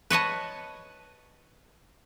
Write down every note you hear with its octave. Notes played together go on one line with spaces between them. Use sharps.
B4 C#5 D#5 A5